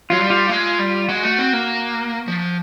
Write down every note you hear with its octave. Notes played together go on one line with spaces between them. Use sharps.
F#3 F4
G3
F4
G#3 F4
G3
G#3 F#4
A3
C4
A#3
F3